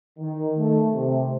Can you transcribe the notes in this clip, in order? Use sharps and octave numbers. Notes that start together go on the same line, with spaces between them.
D#3
A3
C3